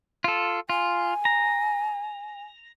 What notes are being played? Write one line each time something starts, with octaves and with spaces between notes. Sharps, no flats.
F4 A4
F4 G#5
A#5